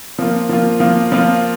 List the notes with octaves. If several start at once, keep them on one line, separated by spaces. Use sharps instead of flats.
F3 A#3 F4
F3 A#3 F4
F3 A#3 F4
F3 A#3 F4